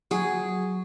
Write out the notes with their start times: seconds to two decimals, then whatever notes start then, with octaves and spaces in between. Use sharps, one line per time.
0.11 F#3 G#4